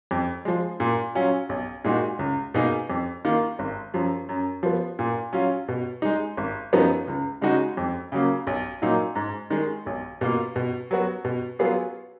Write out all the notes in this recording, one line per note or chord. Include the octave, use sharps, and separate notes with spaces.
F2
F3 G#3
A#2
F#3 C#4 F4
B1
A#2 G#3 D#4 F#4
C#2
B2 A#3 D#4 G#4
F2
D#3 A#3 F4
G#1
F#2 F3
F#2
F3 B3
A#2
F#3 C#4 F4
B2
G#3 D#4
G#1
F#2 F3 B3 D#4
C#2
C#3 G#3 D#4 F#4
F2
C#3 F#3 A#3
B1
A#2 F#3 A#3 D#4
G#2
D#3 G#3
B1
B2 A#3 F4
B2
F#3 B3 F#4
B2
F#3 B3 F4 G#4